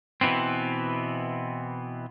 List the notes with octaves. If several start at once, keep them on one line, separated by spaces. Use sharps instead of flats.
B2 E3 B3 C4